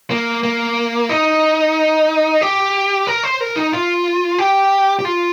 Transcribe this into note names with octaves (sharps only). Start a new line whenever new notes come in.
A#3
A#3
D#4
G4
A#4
C5
A#4
D#4
F4
G4
G4
F4